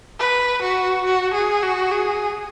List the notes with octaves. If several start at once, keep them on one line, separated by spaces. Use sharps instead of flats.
B4
F#4
F#4
G#4
F#4
G#4